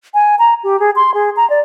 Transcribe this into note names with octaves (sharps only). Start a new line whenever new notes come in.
G#5
A#5
G4
G#4
C6
G#4
A#5
D5